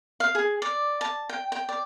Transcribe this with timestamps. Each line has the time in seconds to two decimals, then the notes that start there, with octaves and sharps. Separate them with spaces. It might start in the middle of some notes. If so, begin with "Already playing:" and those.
0.20 F5
0.35 G#4
0.62 D5
1.01 A5
1.29 G5
1.52 G5
1.69 D5